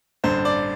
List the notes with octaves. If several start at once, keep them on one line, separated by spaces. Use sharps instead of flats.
A1 G2 D3 C5
D5